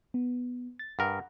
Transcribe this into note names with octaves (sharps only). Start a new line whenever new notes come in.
B3
A6
G2 A#4 F#5